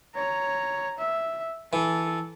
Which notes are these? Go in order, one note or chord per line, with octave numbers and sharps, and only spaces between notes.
C#5 A#5
E5
E3 A4